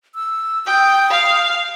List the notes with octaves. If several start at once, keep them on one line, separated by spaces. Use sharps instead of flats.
E6
G5 D#6
F5